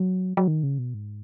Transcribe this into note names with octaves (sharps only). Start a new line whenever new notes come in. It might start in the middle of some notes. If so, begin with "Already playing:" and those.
Already playing: F#3
F#3
D#3
C#3
B2
G#2